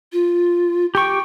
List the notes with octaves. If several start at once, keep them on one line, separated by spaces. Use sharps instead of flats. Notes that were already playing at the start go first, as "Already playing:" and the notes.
F4
G4 G5 C#6